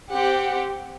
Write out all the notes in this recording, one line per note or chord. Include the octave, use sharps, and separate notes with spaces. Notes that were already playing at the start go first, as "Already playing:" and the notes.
C4 G4 F#5